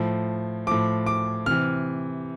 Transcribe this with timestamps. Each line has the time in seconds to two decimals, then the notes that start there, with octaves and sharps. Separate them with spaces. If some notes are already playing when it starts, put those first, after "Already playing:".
Already playing: A2 F3
0.67 A2 F3 D6
1.06 D6
1.46 C3 E3 F6